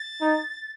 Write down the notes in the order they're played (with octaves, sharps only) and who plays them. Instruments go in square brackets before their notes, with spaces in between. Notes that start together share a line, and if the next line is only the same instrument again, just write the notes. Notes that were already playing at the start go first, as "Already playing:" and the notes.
Already playing: [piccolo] A6
[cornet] D#4